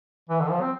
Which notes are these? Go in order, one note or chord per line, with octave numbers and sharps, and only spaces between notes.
E3
D3
F3
C4